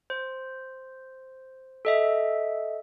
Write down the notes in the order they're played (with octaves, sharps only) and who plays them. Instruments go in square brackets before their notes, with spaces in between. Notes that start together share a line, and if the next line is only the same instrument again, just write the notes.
[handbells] C5
A4 D#5 E5